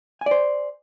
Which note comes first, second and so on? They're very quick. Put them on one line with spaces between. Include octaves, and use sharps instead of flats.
G#5 D5 C5